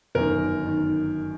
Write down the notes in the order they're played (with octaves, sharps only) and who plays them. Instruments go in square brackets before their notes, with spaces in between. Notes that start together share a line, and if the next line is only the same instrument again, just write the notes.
[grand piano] G1 F#2 D#3 A#4
D#3